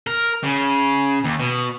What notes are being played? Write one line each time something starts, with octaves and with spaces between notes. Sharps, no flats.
A#4
C#3
D#2
B2